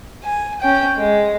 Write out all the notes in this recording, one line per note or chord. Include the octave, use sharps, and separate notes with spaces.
G#5
C#4 G5
G#3